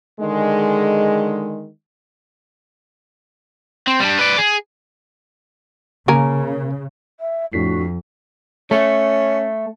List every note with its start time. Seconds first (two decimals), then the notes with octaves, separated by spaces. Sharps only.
0.20 D3 D#3 G#3
3.88 C4
4.00 G3 D4
4.19 B4 D5
4.38 G#4
6.08 C#3 A#3 A#4 G#5
7.20 E5
7.53 F2 A2 D4 F#4 B6 C7
8.71 A3 C#4